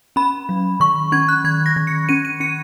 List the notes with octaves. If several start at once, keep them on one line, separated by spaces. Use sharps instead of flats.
C#4 B5
F#3
D#3 C#6
C#4 G#6
F#6
D#3 G#6
A#6
D#3
C#7
C#4 D#7
D#7
C#4 C#7